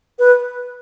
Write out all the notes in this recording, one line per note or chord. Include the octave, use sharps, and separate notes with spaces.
B4